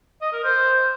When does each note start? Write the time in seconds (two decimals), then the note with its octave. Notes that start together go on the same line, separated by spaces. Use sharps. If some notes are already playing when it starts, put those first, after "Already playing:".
0.22 D#5
0.33 A#4
0.44 C5